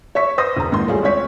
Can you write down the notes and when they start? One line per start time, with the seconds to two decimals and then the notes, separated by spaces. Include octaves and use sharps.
0.15 C#5 E5 C#6 B6
0.38 B4 C5 C6 D#6 A#6
0.56 E1 A#5
0.71 A1 D#2 G#2 D#3 C6
0.88 G3 A3 C#4 F4 G#4
1.02 D2 G#3 C4 C#5 B6